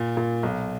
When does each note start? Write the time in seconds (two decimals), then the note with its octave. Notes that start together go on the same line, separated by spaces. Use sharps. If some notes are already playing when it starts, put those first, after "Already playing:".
Already playing: A#2
0.17 A#2
0.43 B1